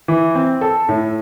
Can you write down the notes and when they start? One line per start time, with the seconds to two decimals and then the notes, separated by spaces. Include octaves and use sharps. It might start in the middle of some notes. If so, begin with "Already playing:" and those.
0.08 E3
0.35 C4
0.61 A4
0.89 A2